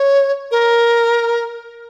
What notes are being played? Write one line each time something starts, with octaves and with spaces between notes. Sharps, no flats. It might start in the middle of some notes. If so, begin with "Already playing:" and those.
Already playing: C#5
A#4